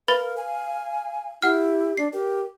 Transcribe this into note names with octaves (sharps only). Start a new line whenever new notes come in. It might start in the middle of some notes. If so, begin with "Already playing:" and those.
A#4 B4 F5 B5 A6
G#5
E4 G4 F#5 F6
D4 C7
G4 A#4